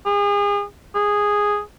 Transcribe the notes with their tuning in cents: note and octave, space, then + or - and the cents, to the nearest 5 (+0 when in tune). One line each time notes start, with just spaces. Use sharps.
G#4 -35
G#4 -5